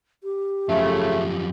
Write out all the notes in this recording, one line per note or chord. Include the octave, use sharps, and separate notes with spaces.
G4
F#2 C#3 F3 A3